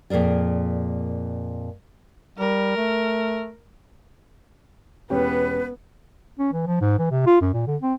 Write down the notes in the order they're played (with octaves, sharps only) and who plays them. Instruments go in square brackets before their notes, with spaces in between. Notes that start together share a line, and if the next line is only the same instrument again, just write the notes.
[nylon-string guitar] F2 A#2 G#4 A#4 D5
[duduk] G3 [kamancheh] A#4
[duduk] A3
[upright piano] E1 C#4 G4 [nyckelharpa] B3 [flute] B4
[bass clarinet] C#4
E3
F3
G#2
E3
C3
F4
F#2
A#2
D3
C4